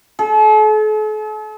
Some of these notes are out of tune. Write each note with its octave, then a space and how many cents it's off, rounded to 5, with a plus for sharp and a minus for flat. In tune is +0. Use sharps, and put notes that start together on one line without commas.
A4 -45